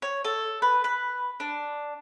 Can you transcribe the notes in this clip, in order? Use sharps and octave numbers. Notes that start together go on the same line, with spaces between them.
C#5
A4
B4
B4
D4